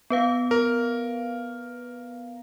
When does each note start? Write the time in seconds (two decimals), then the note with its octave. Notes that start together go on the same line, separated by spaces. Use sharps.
0.10 B3 B4 F5
0.51 A#4